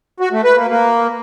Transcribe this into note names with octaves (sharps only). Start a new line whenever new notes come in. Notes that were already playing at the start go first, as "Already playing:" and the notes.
F#4
A3
B4
A#3
A#3